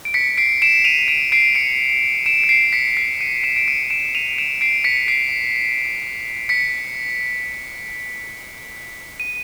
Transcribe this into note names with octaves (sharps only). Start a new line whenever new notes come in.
D7
B6 C#7
C7 D7
D7 E7
D#7 F7
D7 E7
C7 D7
C#7 D#7
D7 E7
C#7
C7 D7
B6 C#7
C7 D7
C#7 D#7
D7 E7
D7
C#7 D#7
D7 E7
D#7 F7
D7 E7
C7 D7
B6 C#7
C7 D7
B6 C#7
D#7